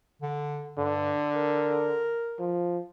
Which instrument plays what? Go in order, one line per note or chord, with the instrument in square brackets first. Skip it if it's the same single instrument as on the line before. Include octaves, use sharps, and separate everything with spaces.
[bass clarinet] D3
[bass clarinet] G2 [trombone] D3
[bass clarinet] A#4
[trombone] F3